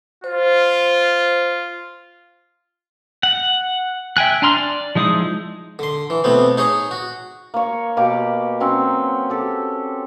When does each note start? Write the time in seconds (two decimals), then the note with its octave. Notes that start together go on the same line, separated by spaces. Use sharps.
0.24 F4 C5
3.23 F#5
4.17 E5 G5 G#5 F#6
4.42 D4 G#5 A#5 C6 F6
4.56 D5
4.95 F3 G#3 D#4 E4 D#6
5.79 D3 C6
6.10 E3
6.24 B2 A3 B3 C4
6.57 D#4 G#4 C#5 D#6
6.91 F#4
7.54 A#3 C#5
7.97 B2 A#3 G4 D6
8.60 F#3 C4 C#4
9.30 G4 A4